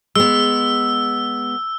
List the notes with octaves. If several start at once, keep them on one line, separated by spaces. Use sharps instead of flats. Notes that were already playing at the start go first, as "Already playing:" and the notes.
G#3 B3 E6